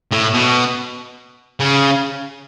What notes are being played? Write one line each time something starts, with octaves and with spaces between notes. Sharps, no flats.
A2
B2
C#3